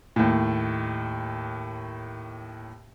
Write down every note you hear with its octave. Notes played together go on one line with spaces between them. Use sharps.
D#2 A2